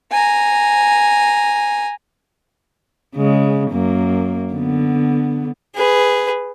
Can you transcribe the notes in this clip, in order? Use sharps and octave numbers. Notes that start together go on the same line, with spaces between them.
G#5 A#5
C#3 G#3
F#2 A#3
D3 B3
G#4 B4